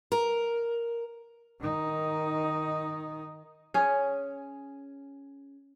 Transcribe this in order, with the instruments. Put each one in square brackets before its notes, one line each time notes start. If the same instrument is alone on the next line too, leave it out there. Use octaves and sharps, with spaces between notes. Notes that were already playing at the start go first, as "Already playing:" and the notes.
[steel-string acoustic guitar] A#4
[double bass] D#3 D#4
[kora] C#4 G#4